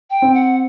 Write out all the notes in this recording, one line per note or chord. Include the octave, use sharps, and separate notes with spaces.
G5
C4
F#5